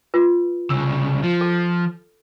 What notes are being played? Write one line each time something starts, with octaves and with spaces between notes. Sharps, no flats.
F4 B4
C2 C#3 E6
F3
A4